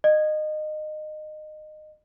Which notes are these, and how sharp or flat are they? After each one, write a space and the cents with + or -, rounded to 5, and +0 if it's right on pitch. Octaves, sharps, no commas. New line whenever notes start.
D#5 -20